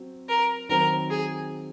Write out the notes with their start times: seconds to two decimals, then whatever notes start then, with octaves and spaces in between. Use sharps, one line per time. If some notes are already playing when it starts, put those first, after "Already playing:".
Already playing: F#3 C4
0.29 A#4
0.69 D#3 F#3 C4 A#4
1.10 G#4